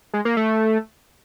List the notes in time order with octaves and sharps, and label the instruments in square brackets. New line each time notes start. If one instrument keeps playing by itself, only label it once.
[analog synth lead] G#3
A#3
A3